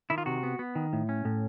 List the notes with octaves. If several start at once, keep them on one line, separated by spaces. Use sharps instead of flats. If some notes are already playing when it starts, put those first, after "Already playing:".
D#3 E4
F4
C3 F#4
B3
B3
D#3
A2
C#4
A2